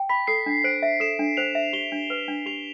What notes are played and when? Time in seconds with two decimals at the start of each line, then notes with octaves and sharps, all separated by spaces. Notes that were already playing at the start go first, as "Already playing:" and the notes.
Already playing: G5
0.09 B5 B6
0.27 A4 C7
0.46 D4
0.64 C5 D7
0.83 E5
1.00 A4 E7
1.19 D4
1.37 C5 F7
1.55 E5
1.73 G4 G7
1.92 D4
2.10 B4
2.28 D4
2.46 G4 F7